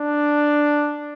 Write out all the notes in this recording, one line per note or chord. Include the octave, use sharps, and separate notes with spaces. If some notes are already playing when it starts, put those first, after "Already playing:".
Already playing: D4